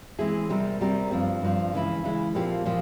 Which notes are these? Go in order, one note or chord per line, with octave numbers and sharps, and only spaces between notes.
E3 G#3 C4 E4 G#4
C3 G3 C4 G4 A#4
C3 G3 C4 G4 A#4
G2 F3 C4
G2 F3 C4
C#3 E3 G#3 E4
C#3 E3 G#3 E4
A#2 F3 C4 G4
A#2 F3